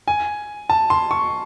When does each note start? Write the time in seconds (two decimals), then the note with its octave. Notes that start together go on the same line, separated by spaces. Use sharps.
0.08 G#5
0.70 A5
0.90 C6
1.11 C#6